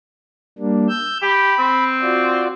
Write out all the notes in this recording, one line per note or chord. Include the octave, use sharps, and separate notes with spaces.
G3 A#3 D4
E6 G6
G4 B5
C4
F4 F#4 D5